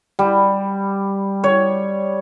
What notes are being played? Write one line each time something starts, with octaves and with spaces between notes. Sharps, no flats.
G3
C#5